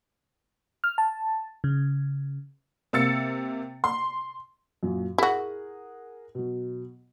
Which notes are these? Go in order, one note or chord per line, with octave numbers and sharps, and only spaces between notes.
F6
A5
C#3
C3 A#3 E6 A6 C#7
C6
F#2 A#2 F#3
E4 F#4 G#4 A#4 F#5
B2 F#3